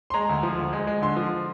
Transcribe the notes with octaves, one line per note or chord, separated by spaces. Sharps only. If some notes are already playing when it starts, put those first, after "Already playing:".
C6
G#3 A#5
D2
F3
D2
G#3
G#3
D3 C6
F3